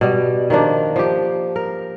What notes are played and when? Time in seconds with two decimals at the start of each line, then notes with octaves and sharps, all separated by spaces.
0.01 B2 G3
0.50 D#3 F3 A#3 D4
0.96 F3 G4
1.56 A#4